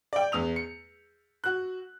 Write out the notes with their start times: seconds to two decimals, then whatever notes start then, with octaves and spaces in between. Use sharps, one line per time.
0.13 D5 G5
0.32 E2 D#6 F7
0.56 C#7
1.44 F#4 F#6